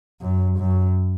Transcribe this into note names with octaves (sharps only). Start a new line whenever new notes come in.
F#2
F#2